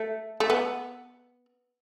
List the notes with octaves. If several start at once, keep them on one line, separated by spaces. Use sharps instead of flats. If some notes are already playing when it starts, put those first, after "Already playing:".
Already playing: A3
A3
B3